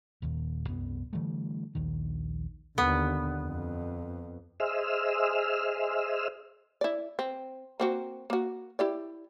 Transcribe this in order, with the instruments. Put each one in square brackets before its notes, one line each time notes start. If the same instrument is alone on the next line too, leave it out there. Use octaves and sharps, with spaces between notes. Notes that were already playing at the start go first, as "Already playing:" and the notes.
[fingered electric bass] D#1 D#2 A#2
C2 F#2 B3
D3 E3 G3 A3
A#1 D#2 D#3
[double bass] D#2 D3 [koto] B3
[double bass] F2
[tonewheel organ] G#4 C5 D#5 E5 E6 F6
[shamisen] E4 D5
C4
A#3 C4 F#4
A#3 F#4
E4 G4 D5